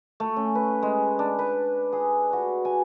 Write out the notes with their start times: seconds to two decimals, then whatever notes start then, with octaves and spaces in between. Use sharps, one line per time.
0.20 A3
0.36 C#4
0.55 B4
0.82 G#3
1.19 D4
1.39 B4
1.92 G#4
2.33 F#4
2.65 G#5